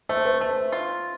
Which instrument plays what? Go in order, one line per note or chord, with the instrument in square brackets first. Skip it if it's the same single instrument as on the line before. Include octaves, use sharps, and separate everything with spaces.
[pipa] A3 [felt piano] C5
[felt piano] B4
[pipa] A3 [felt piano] C5
[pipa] F4